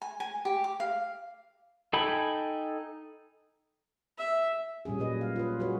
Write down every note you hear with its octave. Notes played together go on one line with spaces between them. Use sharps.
G#5
G#5
G4
D6
F5
D#4 A4 G5 G#5 B5
E5
A#2 G3 C#4 G#4
A#2 F#3 B4 D#5
F5
F4 B4
F#3 G#3 F#4 G#4 B4 C#5